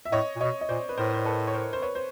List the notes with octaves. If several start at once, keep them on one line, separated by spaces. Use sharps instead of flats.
E5
A2 C#5 D#5
A#2
B2 C#5 D#5
D#5
A#2 C5 D5
B4
A2 A#4 C5
C5
A4 B4
C#5
A#4 C5
C5
B4 C#5
C5